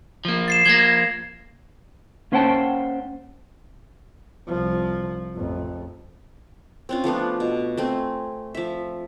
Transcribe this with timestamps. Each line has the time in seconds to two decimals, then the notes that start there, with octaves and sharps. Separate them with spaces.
0.25 F3 A#3
0.48 A6 C7 E7
0.66 F3 A#3 G#6 A#6
2.32 A#3 C#4 C5 F#5 G5 A5
4.47 C2 F3
5.35 A1 F2
6.89 C4 C#4 F4
7.04 F3 A3 B3 D4
7.40 B2
7.77 A3 C4 G#5
8.55 F3 E5